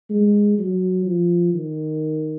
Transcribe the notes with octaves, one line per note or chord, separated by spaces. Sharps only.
G#3
F#3
F3
D#3